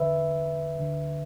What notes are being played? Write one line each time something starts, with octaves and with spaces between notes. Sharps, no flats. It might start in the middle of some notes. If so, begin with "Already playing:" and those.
Already playing: E2 D3 B4 E5
D2 D3